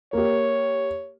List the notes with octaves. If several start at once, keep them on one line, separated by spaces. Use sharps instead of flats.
A#3 G4 C#5